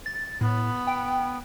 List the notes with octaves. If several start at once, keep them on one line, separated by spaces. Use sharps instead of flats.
A6
A2 B3
G5